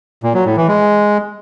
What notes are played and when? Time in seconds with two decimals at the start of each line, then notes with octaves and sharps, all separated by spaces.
0.23 A#2
0.34 F#3
0.45 A2
0.57 E3
0.68 G#3